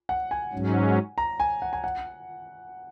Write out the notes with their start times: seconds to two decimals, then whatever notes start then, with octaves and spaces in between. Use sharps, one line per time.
0.09 F#5
0.31 G#5
0.53 G#2 F#3 C#4
1.18 A#5
1.40 G#5
1.62 F#5
1.73 G#5
1.84 F#5